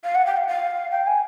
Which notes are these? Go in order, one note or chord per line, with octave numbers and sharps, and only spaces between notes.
F5
F#5
G5
F5
F5
G5
G#5